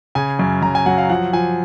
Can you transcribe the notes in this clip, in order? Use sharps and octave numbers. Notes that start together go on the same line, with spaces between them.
C#3 G#5
F#2
F#2 A#5
G#5
F#3 F#5
F5
F3 F#5
F3 G#5